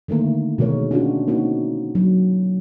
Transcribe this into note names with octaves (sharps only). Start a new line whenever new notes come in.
D3 D#3 A3 A#3
B2 D#3 G#3 A#4 C#5
C#4 D4 F4 F#4
A#3 C4 D#4 F#4
F#3